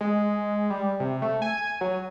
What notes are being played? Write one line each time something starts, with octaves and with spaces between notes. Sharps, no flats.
G#3
G3
C3
A3
G#5
F#3